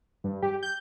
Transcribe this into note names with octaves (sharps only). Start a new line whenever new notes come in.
G2
G4
G6